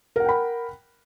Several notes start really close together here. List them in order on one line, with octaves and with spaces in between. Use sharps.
A#4 F#5 G5 B5